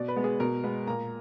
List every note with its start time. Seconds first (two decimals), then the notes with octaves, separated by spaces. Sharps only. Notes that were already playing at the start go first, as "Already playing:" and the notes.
Already playing: B2 D5
0.08 B4
0.16 G#3 B3
0.24 G#4
0.40 B2 A#4
0.63 G#3 B3 B4
0.87 A#2 A#5